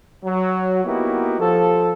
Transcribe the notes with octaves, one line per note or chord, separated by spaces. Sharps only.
F#3
A#3 B3 D#4 E4 F#4 G4
F3 A4